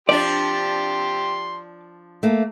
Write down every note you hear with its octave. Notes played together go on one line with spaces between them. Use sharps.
F3 D4 G4 D5 C6
A3 A#3